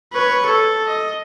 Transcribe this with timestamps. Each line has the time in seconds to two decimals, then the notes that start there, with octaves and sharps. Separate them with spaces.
0.13 B4 C#5
0.46 A4
0.87 D#5